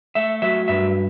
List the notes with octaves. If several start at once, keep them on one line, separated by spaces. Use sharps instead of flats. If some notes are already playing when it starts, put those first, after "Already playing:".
A3 E5
F#3 E5
G2 E5